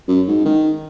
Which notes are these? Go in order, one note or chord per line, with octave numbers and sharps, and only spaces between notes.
F#2
G#2
D#3